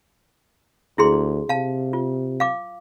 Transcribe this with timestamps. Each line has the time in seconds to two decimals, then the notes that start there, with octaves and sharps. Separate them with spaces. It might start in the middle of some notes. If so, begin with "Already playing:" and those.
0.98 D2 E4 G#4 C6
1.49 C3 F5 A5
1.93 F4
2.40 F5 D6